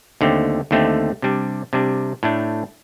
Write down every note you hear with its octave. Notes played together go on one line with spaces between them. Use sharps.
D#2 D3 A3 C4
D#2 D3 A3 C4
C3 G3 D4
C3 G3 D4
A2 A3 D4